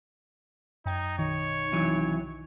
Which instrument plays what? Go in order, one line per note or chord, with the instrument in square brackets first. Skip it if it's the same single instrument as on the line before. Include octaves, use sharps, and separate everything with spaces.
[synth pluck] F#2 G5 G#6 [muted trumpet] D#4
[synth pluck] B1 D#3 D#4 [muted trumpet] C#5
[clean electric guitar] C3 E3 F#3